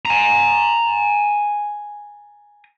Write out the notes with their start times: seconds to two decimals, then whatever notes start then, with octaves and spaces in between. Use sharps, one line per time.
0.05 G#5 A#5